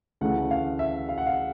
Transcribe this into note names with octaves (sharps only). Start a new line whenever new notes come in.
D2 C#3 E3 A3 F#5
F5
E5
F5
F#5
F5